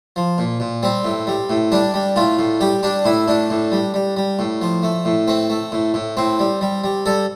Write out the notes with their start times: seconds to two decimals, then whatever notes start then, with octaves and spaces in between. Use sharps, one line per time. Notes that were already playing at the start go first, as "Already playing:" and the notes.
0.16 F3
0.38 A#2
0.60 A#2
0.83 G3 C4
1.04 A2
1.27 G3
1.50 A2
1.72 G3 D4
1.94 G3
2.16 A2 F4
2.39 A2
2.61 G3 G4
2.83 G3 D4
3.05 A2 E4
3.28 A2 D4
3.50 A2
3.72 G3
3.94 G3
4.16 G3
4.39 A2
4.62 F3
4.83 A3
5.05 A2
5.28 A3 C4
5.50 A3
5.72 A2
5.94 A2
6.17 A2 C4
6.39 G3
6.61 G3
6.84 G3
7.06 G3 A4